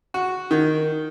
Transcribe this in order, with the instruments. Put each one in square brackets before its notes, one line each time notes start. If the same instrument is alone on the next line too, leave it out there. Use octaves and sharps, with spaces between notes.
[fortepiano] F#4
D#3